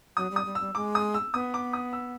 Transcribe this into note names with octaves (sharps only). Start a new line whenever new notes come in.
F#3 D#6
G3
D#6
G3
E6
G3
G#3 D6
D#6
E6
B3 D#6
D6
D#6
E6